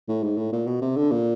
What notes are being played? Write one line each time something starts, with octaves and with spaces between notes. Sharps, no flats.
A2
G#2
A2
A#2
B2
C3
D3
A#2